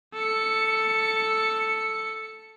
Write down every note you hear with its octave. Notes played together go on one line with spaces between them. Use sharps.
A4 C#7